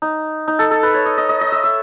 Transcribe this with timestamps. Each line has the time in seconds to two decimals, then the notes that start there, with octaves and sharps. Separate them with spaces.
0.02 D#4
0.48 D#4
0.59 A4
0.71 A4
0.83 B4
0.94 C#5
1.06 D#5
1.18 D#5
1.29 D#5
1.41 D#5
1.52 E5
1.64 E5